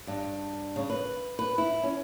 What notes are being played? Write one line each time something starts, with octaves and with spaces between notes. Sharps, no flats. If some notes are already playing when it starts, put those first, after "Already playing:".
G2
C#3
B4
B4
E4
C#4